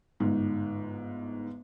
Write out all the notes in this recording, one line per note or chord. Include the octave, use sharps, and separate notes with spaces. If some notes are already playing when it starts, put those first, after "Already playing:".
G1 G#2